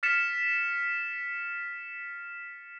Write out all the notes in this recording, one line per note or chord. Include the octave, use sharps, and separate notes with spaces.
F6 A6 B6 C#7 E7